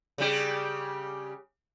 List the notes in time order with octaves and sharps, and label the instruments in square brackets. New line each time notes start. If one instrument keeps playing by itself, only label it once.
[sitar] C#3 G3 G4